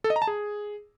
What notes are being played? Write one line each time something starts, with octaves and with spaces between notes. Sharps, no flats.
A4
D#5
A#5
A5
G#4